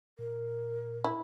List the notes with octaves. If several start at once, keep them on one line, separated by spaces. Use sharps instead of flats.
A#2 A#4
E4